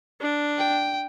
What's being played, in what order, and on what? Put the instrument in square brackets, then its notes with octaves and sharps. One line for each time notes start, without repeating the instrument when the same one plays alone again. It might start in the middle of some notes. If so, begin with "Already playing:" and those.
[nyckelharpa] D4
[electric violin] G5